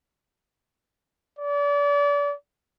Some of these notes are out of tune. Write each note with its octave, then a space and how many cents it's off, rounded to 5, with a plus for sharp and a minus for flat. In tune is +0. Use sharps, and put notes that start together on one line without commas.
D5 -35